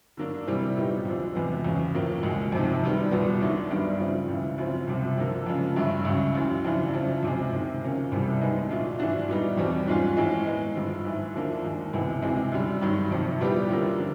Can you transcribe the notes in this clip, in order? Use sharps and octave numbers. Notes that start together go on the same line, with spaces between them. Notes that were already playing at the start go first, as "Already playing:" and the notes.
D3 F#3 A#3 D4
C3 E3 G3 C4 E4
A#2 F#3 B3 D#4 G4
D2 D3 F3
E2 C3 F3 G#3 B3
E2 C#3 F#3
A2 F3 A#3
C#2 B2 G#3
F2 C3 D#3
F#2 D#3 G3 B3
C2 A#2 F#3 B3
F#2 D#3 F#3 A3 D4
G2 D#3 G3 B3 D4
C#3 F3 A3
C#2 C#3 E3
F#2 C#3 F3 A3 C4
C2 C3 F3
F2 D3 F3 A#3
F2 C#3 F3 G#3
G2 D3 F#3 A3
C#2 C#3 F#3
F#2 C#3 E3
F2 C#3 E3 A3 D4
F2 C#3 F3
D2 C3 F3 G#3
C3 D#3 G#3
C#3 F3 A#3 C#4
C2 C3 E3 G3
F#2 D#3 G#3 B3 D#4
A#2 F#3 A3 D4 F4
G#2 E3 A3 D4 F#4
A#2 G3 B3 D#4
E2 B2 G3 C4
G#2 F3 G#3 C#4 F4
A2 E3 G#3
D#3 G#3 B3 D#4
G2 D3 F3
G#2 E3 A3
D#2 D3 F3 A#3 D4
D#2 D#3 G#3
C#2 C3 E3 G#3 B3
D2 C3 E3 G#3 C4
F#2 D3 G3
G2 D#3 F#3
F2 C3 D#3
A#2 G3 B3 E4 G4
F#2 D3 F3 A#3
D3 F3